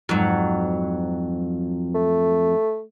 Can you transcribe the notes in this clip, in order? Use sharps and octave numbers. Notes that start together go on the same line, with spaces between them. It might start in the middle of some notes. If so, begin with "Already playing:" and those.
F2 G#2 F#3
A3